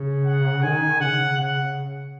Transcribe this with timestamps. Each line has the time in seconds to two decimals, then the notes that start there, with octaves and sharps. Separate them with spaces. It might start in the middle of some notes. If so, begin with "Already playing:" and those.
Already playing: C#3
0.26 F#5
0.62 D#3 G#5
1.00 C#3 F#5
1.38 F#5